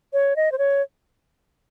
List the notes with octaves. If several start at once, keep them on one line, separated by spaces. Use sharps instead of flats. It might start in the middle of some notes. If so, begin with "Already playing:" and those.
C#5
D#5
C5
C#5